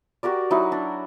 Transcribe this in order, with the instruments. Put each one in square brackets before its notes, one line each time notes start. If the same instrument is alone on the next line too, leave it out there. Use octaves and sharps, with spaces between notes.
[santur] F#4 G4 A#4 D5
F#3 D#4 E4
D4